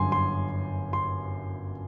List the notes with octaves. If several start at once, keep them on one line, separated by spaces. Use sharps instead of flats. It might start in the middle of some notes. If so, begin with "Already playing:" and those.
Already playing: G1 F#2 D3 G3 G#5 C6
C6
C6